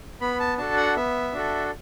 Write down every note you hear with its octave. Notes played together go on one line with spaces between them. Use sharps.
B3 B5
A5
D4 F#4 A4 A5
F#5
B3 E5
D4 F#4 A4